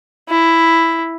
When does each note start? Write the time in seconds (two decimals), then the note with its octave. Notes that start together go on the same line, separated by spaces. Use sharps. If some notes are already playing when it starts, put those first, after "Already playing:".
0.29 E4